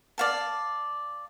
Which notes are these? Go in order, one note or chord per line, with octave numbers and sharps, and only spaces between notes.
D5 F5 A5